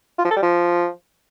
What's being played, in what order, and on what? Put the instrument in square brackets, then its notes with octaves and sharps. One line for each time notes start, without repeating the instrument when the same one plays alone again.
[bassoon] F4
F3
A4
G3
F3